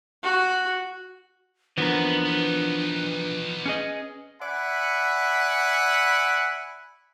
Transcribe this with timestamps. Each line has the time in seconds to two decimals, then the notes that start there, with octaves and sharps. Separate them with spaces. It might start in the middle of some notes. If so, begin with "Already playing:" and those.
0.23 F#4
1.78 D#2 E3 F3 D4 A#4 B4 F#5
2.26 B3 D#4
3.66 C#4 G#4 D#5
4.41 D5 E5 F#5 G#5 B5